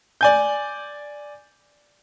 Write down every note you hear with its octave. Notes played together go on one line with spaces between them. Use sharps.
D5 G#5 G6